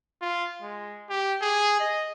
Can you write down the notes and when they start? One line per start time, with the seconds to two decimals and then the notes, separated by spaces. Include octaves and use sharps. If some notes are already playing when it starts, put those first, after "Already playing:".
0.22 F4
0.62 G#3
1.10 G4
1.42 G#4
1.80 D#5